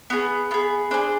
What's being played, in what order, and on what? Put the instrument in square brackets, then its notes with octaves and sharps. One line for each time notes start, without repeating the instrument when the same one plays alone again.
[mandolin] B3 F4 G#4
B3 F4 G#4
D4 G#4 C5